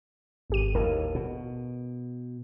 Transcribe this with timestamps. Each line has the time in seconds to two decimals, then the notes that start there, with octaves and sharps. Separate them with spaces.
0.50 G#1 G4 D#7
0.75 D#2 A2 A#4
1.15 B2